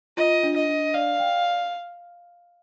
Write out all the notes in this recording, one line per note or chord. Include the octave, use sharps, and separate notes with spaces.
F4 D#5
D4
D#5
D4
D5 F5
G5